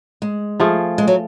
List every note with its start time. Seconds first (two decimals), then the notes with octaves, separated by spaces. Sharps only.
0.22 G#3
0.60 F3 A3 F4 G#4
0.98 G#3
1.07 F#3